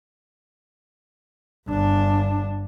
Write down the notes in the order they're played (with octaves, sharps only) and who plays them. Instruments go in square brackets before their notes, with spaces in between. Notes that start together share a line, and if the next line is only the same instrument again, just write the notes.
[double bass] G1 D4